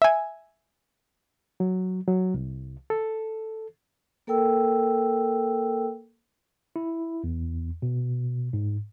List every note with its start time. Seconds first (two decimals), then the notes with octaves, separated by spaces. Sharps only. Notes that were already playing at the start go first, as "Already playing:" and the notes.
0.02 E5 G#5
1.60 F#3
2.08 F#3
2.34 C2
2.90 A4
4.27 A#3 A4 A#4 G5 E6
6.76 E4
7.24 E2
7.82 B2
8.53 G#2